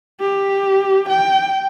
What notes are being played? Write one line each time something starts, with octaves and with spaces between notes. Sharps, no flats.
G4
G5